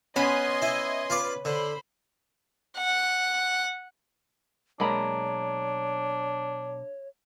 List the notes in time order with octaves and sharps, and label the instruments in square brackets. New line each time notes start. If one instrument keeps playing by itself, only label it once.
[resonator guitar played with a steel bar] B3 C#4 [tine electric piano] C#5 [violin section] D#5 G#5 C6 [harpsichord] B5
[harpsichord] E4
[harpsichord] F4 D5 [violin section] B4
[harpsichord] D3 [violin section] C5 B5
[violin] F#5
[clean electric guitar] B1 A#5 [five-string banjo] G#3 A#3 B5 [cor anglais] D4 [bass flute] C#5